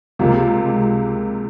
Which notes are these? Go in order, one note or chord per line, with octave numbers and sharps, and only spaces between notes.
C#2 C3 F3 A#3 F4
G#3